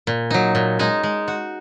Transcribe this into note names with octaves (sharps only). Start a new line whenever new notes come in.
A#2
F#3 D#4
A#2
G#3 D#4
G#3
F#4